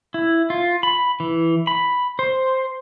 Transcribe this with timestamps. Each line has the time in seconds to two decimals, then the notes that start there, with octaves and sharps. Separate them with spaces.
0.14 E4
0.50 F4
0.83 B5
1.20 E3
1.67 B5
2.19 C5